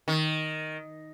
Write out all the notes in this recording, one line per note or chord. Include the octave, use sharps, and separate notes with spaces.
D#3